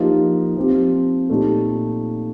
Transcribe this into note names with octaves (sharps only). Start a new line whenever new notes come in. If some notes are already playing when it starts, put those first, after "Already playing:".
Already playing: F3 A#3 D#4 G4
F3 C4 G4
A#2 A3 D#4 G4